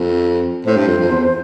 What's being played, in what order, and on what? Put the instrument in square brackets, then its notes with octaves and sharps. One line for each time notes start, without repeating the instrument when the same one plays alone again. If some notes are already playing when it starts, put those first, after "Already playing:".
Already playing: [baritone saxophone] F2
[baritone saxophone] A2 [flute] C5
[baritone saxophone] G2
F2
F2
E2